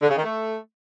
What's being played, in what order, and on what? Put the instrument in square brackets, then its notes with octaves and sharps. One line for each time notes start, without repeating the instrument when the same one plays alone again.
[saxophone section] D3
C#3
D#3
A3